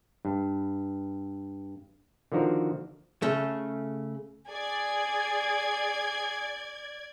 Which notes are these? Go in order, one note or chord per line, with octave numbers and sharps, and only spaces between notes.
G2
D3 D#3 F3 F#4 A#4
C#3 A3
G#4 D5 G#6